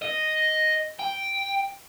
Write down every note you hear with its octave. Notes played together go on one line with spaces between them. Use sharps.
D#5
G5